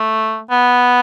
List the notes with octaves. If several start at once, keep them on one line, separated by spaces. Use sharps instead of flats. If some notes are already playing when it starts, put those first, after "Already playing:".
Already playing: A3
B3